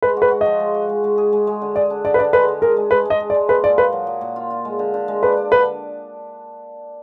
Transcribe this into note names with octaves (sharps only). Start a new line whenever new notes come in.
G#3 B4
F#4
B4
F#4
F3 D#5
G#3
F#4
G#3
G#3
G#4
G#3
G#3
D3
G#4 D5
D4
D3 D5
B4
D4 D5
G#3 B4
G#3
G#4 A#4
G#3
G#3 B4
G#3 D#5
G#4
D5
G#3
A#2 B4
F4 D5
A#2 B4
F#3
F#3
A#2
F4
F4
G#3
D3
D3
G#3
D4 B4
D4
D3 B4